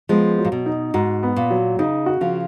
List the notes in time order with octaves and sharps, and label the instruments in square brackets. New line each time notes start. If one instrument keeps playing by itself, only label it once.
[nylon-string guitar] F3 G#3 [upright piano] B3
[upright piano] F#3
[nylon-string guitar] A#2
B2
[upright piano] D#4
[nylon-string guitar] G#2 [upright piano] F#4
[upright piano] B3
[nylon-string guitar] A#2
[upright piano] F#3
[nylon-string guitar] C#3 [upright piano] D#4
[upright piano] F#4
[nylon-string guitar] C#3 F3